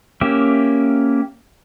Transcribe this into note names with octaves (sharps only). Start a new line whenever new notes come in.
A#3 C#4 G4 E5